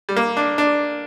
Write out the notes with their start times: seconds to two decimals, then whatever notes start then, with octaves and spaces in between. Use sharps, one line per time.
0.09 G3
0.16 A#3
0.37 D4
0.58 D4